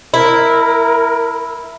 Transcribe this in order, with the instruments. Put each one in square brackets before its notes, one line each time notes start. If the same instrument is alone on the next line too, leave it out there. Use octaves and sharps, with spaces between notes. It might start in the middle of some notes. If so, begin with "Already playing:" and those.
[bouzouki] E4 [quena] A#4